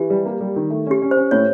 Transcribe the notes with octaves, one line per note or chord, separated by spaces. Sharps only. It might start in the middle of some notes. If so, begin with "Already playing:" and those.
Already playing: E3 G4
G3
A#3
G3
D#3
A3
C#4 G4
C#4
C5
C#4
A2 C#5